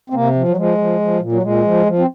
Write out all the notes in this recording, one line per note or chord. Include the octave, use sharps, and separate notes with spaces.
C4
C3 A#3
F3
F#3
F3 G#3
F3
F3
A#2
F#3
A#2 G#3
F3
F3
C4